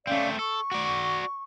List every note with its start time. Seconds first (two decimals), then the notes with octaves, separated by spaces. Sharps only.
0.07 A3 C4 C#4 D5 F5
0.39 A4 C#6
0.72 F#4 D5